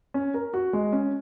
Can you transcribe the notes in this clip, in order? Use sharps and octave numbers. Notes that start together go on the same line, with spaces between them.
C#4
A#4
F#4
G#3
C#4